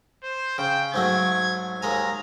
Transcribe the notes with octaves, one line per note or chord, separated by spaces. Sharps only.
C5
C#3 G5
G#2 F#3 A3 G#6
D#2 G#3 G#5 A#5